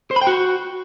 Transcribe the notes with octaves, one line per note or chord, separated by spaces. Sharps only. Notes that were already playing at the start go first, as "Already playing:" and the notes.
C5
B5
G5
F#4